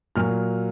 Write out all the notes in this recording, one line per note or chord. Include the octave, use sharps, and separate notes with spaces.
A#2 F#3 F6